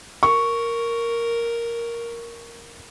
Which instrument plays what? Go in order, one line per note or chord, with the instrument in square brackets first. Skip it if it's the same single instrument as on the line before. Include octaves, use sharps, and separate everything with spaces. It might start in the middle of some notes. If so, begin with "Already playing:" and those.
[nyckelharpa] A#4 [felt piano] C#6